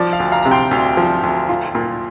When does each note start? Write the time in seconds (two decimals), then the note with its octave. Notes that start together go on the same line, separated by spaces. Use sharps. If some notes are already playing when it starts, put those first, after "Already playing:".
Already playing: F3 D5
0.13 F5
0.20 D2
0.32 F5 A#5
0.43 C3 A#5
0.51 G5 C6
0.71 D2
0.97 F3
1.23 D2
1.49 F4
1.75 A#2